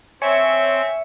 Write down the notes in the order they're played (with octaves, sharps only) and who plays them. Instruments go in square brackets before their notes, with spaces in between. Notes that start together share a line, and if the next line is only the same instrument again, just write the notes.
[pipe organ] C4 [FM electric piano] C#5 G#5 C#7 [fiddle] E5